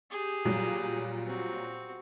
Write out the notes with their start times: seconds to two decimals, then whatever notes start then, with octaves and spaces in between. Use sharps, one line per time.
0.11 G4 G#4
0.45 A#2 F#3 G3
1.26 C4 F#4